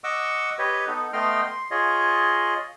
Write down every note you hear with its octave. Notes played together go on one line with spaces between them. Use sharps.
D#5 F#5 C#6 D6 E6
G4 B4 C#5 D#5
B3 D#4 A4
A3 B3 D#5 G5 C6 F6
C6
F4 G#4 C#5 D#5